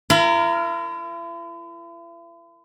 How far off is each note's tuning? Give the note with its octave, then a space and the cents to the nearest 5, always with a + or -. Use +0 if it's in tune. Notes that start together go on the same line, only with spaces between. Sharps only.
E4 +45 A#4 -5 B5 +30